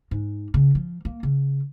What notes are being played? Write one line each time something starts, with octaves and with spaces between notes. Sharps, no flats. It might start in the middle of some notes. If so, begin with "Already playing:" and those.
G#2
C#3
F3
A#3
C#3